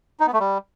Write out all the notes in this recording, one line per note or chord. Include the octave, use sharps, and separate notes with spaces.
D#4
B3
A3
G3